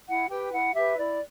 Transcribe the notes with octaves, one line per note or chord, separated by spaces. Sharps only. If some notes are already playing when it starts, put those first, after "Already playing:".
E4 F#5
G4 B4 G5
E4 F#5
G4 B4 E5
E4 D5